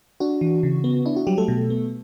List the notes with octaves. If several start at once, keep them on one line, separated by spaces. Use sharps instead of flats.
D4 F#4
E3
C#3
B3
D4 E4
F#4
F#3 G3 G4
A3 A4
B2
B3